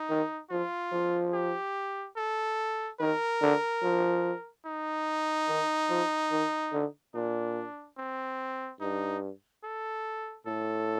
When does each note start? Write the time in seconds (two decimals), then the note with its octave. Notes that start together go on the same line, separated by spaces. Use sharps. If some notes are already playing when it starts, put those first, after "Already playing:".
Already playing: D#4
0.10 D#3
0.50 F3 F4
0.92 F3
1.33 G4
2.17 A4
3.00 D#3 A#4
3.41 D3
3.83 F3
4.66 D#4
5.48 D#3
5.90 F3
6.31 D#3
6.73 D3
7.14 A#2 D4
7.97 C4
8.80 G2 D#4
9.64 A4
10.46 A2 A4